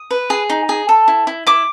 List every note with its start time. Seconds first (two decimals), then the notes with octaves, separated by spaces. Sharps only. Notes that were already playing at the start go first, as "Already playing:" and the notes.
Already playing: D#6
0.11 B4
0.30 G#4
0.50 D#4
0.69 G#4
0.89 A4
1.08 E4
1.27 E4
1.47 E4 D6